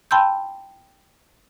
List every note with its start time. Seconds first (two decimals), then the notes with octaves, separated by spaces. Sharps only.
0.11 G5 A5 B5 C6 E6 G6